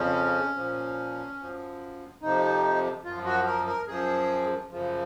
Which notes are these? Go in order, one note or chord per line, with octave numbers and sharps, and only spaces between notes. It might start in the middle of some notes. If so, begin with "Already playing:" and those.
Already playing: F2 C#3 F3 C#4
A#2 F3
F#2 F3
F2 C3 F3 D#4
F#2 F3 F4
F#4
A#4
A#4
F#2 F3 G#4
F#2 C#3 F3